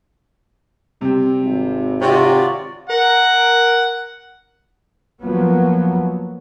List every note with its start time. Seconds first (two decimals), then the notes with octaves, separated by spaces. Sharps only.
1.01 C3 G3 C4
1.44 G#1
2.01 C3 F4 F#4 C#5 D5
2.90 A#4 F#5
5.22 F3 F#3 A#3 B3